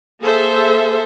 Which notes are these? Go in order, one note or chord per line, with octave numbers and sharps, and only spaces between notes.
A#3 G#4 A4 C5 E5